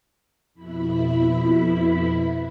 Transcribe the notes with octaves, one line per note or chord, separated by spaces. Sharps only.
F2 B2 E4 B5